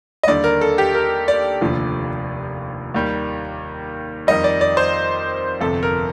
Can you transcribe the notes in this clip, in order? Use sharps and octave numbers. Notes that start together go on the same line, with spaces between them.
D#5
D#2 D3 G3 D5
A#4
A4
G4
A#4
D5
F1 D#2 D3 F3
D#2 D#3 G3
F2 D#3 G3 D#5
D5
D5
C5
G1 F2 C3 A4
A#4